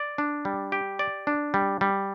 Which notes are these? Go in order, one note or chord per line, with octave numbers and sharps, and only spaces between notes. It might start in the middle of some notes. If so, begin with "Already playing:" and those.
Already playing: D5
D4
G3
G4
D5
D4
G3
G3